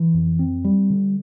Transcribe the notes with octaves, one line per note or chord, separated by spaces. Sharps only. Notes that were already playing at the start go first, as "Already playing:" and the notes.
Already playing: E3
F2
C4
G3
D3